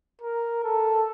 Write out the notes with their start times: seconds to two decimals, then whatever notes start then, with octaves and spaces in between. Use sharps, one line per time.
0.22 A#4
0.64 A4